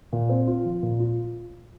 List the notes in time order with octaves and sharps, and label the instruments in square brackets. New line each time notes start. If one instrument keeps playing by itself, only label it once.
[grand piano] A#2
C4
F4
F3
A#2
F4